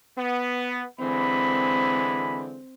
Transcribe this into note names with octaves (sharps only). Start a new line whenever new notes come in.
B3
D3 E3 G#3 C4 B5